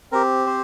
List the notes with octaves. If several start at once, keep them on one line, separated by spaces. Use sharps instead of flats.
C4 G4 A#4
C5